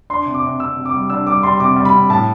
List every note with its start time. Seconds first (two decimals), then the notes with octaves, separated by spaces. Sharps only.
0.10 D4 C6
0.26 C3
0.34 D6
0.43 C3
0.60 C3 E6
0.77 C3
0.85 D6
0.93 G3
1.10 D4 E6
1.27 G3 D6
1.43 G3 C6
1.60 C3 D6
1.76 G3
1.85 B5
1.93 C3
2.10 A2 A5